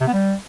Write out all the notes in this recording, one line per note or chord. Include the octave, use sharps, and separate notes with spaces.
C3
B3
G3